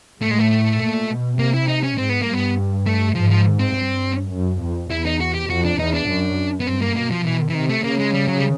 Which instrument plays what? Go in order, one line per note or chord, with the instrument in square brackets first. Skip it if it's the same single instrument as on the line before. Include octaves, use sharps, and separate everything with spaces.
[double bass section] A2 [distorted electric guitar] A3
[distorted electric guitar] G#3
A3
[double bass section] A#2
B2
[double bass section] C3 [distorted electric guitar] A#3
[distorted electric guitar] E4
D#4
C#4
[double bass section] G#2 [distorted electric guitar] C4
[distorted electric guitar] B3
A#3
[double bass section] G2
[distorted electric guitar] B3
A3
[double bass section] G#2 [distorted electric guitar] F3
[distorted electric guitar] F3
C4
[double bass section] G2
F#2
F2
[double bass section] E2 [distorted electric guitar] E4
[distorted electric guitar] D#4
F#4
G4
[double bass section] F2 [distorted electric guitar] F#4
[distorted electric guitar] D4
[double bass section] E2 [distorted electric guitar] D#4
[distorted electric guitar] D4
[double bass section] F#2
[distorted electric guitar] B3
[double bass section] G2 [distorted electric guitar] C4
[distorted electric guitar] A#3
[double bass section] B2 [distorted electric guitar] A#3
[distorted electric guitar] F3
[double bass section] B2 [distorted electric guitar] E3
[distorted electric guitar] E3
[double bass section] C3 [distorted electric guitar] D#3
[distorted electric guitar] A3
[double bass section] C#3 [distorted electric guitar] A#3
[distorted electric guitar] G#3
G3
F#3
G3